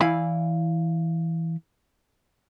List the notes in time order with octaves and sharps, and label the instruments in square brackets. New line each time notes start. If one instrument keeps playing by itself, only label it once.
[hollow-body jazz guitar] E3 E4 D5 F5 G#5 B5